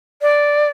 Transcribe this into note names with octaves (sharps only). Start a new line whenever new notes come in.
D5